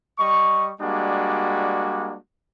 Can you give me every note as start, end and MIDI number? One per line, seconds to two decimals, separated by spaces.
0.19 0.72 55
0.19 0.72 75
0.19 0.72 85
0.81 2.17 55
0.81 2.17 56
0.81 2.17 58
0.81 2.17 62
0.81 2.17 66